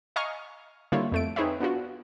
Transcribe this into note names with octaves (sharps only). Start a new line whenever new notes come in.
D#5 F5 G#5 A#5 C#6 F6
D3 G3 A#3 E4 F4 C#5
F2 A3 D7
C4 D#4 G#4 B4 C#5 E5
B3 D4 F4 F#4